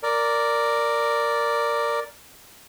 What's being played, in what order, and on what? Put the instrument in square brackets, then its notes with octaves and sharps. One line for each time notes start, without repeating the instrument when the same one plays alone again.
[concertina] A#4 D5